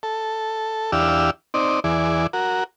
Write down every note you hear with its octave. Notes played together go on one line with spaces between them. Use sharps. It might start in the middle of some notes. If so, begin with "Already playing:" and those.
A4
E2 D4 G4 F5 E6
C4 D#4 D5
E2 E3 G#4 D5
F#4 A#4